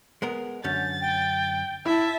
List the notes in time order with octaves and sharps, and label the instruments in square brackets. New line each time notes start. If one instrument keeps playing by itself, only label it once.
[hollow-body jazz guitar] G#3 B3 A#4
[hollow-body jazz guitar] F#2 D3 C#4 [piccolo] G6 [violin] A6
[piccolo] G5
[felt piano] E4 [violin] E5 A5